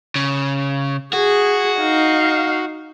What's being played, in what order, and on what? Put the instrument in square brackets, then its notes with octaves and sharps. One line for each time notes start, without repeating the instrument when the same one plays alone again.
[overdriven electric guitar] C#3
[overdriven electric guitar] F#4 [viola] G#4
[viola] D#4 F5